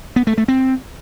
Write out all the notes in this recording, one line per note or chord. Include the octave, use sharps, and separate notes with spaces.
B3
A3
A3
C4